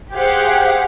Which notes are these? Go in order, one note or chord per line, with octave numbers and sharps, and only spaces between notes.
G4 G#4 C5 F5 F#5